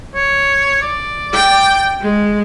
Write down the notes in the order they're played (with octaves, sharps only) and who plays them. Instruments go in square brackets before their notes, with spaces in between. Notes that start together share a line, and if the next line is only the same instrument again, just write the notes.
[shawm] C#5
D5
[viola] G5
G#3